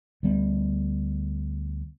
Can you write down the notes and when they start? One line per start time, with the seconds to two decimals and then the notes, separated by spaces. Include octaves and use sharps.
0.23 D2 G3 B3